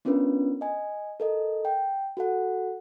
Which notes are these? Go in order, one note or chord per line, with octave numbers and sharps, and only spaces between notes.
B3 C#4 D4 F4 A#4 B4
D#5 G#5
A4 A#4 D#5
G5
F#4 A4 F#5